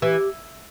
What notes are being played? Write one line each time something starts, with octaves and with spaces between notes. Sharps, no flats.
E3 G4